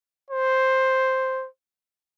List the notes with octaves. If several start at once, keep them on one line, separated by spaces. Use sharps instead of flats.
C5